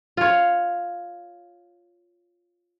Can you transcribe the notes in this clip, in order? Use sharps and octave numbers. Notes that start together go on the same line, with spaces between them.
F4 C#5